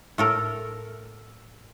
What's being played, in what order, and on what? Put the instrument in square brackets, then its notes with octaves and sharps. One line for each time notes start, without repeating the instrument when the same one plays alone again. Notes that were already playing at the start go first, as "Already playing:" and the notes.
[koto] A2 A4 A#4